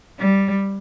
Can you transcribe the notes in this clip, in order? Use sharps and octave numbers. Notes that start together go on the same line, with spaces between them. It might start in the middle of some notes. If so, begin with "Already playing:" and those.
G3